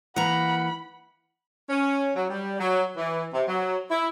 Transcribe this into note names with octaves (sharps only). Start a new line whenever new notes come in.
E3 A#3 F#5 A#5 B5
C#4
F#3
G3
F#3
E3
C3
F#3
E4